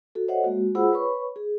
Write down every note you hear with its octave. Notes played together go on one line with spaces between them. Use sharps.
F#4 A4
A4 C5 C#5 D#5 E5 F#5
G#3 A#3 F#4
F4 G#4 C5 F#5 B5 E6
B4 C#5 B5 C#6
G#4